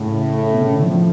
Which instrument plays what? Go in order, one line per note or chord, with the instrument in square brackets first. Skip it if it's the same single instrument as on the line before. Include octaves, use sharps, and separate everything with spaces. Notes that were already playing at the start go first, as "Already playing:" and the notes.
Already playing: [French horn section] A2 [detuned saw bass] C#3
[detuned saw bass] B2
C#3
D3
F3